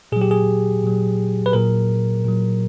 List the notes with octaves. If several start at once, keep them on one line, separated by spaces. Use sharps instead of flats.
A#2 F#3 G#4
G4
G#4
A#2 F#3
B4
A#2 F#3 A#4
A#2 F#3